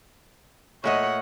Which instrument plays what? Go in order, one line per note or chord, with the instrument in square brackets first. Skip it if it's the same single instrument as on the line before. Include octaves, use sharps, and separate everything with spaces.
[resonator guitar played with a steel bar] A#2 A3 D#5 [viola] C#5 F#5